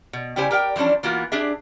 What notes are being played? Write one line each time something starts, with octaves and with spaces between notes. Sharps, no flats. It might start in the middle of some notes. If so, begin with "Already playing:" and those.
B2
C#3 G3 E4 G4 C5 G#5
G4 A#4 D5 F5 G5
E3 F3 G3 C#4 D4
E3 A#3 B3 F4 F#4
D4 G4 G#4 E5